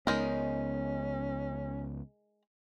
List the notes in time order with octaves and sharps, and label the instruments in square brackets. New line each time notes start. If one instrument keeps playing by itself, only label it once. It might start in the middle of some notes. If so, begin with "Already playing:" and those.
[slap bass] C#2 B3 [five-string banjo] G#3 D#4 A#4 [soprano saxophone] C#4